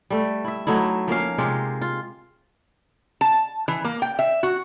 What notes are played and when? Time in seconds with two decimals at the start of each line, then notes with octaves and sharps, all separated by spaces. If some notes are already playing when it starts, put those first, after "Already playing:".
0.10 G3 A3
0.45 E4 E5
0.67 F#3 A3 D#4 E4
1.08 F3 A#3 C#4 F5
1.38 C3 G#3 F4 G4
1.82 F4
3.21 A5
3.68 E3
3.85 A#3
4.02 G5
4.19 E5
4.43 F#4